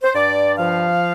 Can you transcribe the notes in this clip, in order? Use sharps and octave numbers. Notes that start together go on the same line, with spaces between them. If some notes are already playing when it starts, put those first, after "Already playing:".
C5
G2 D5
F3 F5